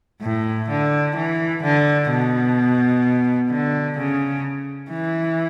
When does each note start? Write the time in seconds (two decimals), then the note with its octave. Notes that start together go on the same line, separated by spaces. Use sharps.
0.22 A2
0.69 D3
1.16 E3
1.63 D3
2.10 B2
3.51 D3
3.98 C#3
4.91 E3